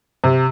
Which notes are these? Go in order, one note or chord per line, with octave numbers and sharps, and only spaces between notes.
C3